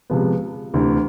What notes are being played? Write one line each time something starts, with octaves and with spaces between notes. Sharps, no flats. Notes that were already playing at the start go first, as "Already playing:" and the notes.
C3 F3 G#3 B3
D2 C3 E3